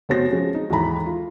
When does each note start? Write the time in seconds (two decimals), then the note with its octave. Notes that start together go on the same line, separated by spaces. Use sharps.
0.09 F1 B3 F#4 C5 C#5 A#6
0.31 F3 G#3 C#4
0.54 D#4
0.70 D#2 G#2 E3 A4 A#5 B5
1.06 F4